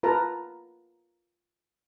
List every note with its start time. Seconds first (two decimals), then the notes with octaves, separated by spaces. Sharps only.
0.03 F4 A#4 B4 A5 A#5